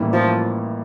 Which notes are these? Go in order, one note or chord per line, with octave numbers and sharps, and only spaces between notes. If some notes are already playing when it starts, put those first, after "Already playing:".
Already playing: A1 A2 E3 G3 A#3
F3